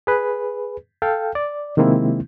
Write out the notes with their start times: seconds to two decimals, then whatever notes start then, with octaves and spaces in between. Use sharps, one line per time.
0.07 G#4 B4
1.02 A4 F5 G5
1.35 D5
1.77 C3 D#3 G#3 A#3 C4 E4